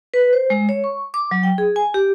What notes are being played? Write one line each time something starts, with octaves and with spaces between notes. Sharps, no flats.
B4
C5
G#3
C#5
C#6
D6
F#3
G5
G#4
G#5
G4